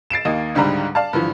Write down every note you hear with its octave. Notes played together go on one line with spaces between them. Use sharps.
A6 C7 D7 E7
D#2 A#3 D#5
C#2 G#2 D3 G3 A#5 B5
D5 F5 A5
G2 D3 E3 F3